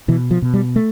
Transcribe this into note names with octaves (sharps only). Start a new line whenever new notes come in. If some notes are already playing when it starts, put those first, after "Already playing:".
B2 E3
F3
B2
G3
A3